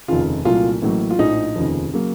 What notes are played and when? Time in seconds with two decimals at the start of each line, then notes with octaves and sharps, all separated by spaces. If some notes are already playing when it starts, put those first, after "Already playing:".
0.08 F1 D#2 C#3 F4
0.45 C2 A#2 F#3 A3 F4
0.82 A1 A2 F#3 A#3
1.10 F4
1.19 A#1 A2 F3 D#4
1.56 F1 D#2 C#3 F3
1.93 C#3 F#3 A#3